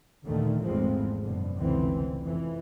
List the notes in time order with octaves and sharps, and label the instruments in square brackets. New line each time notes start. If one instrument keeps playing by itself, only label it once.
[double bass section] D#2 A#2 D3 D#3 A3
G#1 E2 F3 G#3 A3 C4
F#1 B2 D3
F1 C#2 D3 E3 C4
F2 E3